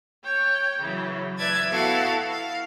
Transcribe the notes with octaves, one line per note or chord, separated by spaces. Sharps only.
C#5 G5
C#3 E3 F#3
B4 D5 E5 A5 G#6 A6
B3 E4 F#4 A4 F5 A5
F5